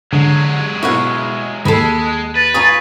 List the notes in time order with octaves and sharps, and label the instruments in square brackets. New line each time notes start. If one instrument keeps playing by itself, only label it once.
[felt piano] D3 [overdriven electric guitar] F#3 G#3
[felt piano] B2 E4 [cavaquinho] C#5 F5 F#5
[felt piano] D#2 [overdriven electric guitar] G#3 [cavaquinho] A4 B5
[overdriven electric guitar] B4 [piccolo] A6
[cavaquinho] F4 G#4 C#5 [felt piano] A#5 D#6